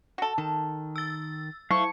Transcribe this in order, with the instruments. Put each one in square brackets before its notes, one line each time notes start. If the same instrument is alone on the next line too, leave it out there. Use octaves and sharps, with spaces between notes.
[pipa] F#4 A4
[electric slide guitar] D#3 [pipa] A4
[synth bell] E6 A6
[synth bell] F#3 [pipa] A3 [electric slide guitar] F5 [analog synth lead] C#6